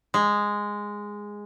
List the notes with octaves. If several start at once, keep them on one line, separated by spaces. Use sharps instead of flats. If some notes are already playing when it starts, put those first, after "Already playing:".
G#3